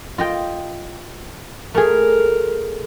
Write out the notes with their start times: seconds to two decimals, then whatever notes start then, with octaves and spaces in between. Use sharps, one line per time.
0.18 F4 D#5 G5
1.74 A3 G#4 A#4